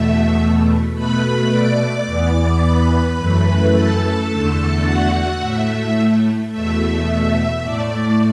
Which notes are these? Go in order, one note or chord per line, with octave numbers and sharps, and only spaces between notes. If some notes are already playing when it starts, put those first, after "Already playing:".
Already playing: E2 B2 A3 E5
B2 A3 B4 B5
D5 D6
E2 E3 B3
B4 B5
F#2 E3 A3
A4 A5
E2 D3 A3
F#4 F#5
A2 A3 E5
E2 B2 A3 E5
A2 A3 D5